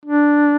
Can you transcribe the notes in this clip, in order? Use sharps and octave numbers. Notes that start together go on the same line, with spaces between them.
D4